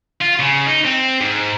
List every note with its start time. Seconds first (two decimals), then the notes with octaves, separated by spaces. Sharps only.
0.21 F4
0.39 C#3
0.66 D#4
0.84 C4
1.21 G#2